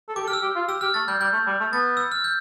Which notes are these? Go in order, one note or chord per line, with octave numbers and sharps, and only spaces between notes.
A4
G4 D6
A4
G4 F6
E6
G4
F4
G4 E6
G4 F6
A3 A6
G3 G6
G3 G6
A3
G3
A3
B3 A6
E6
F6
G6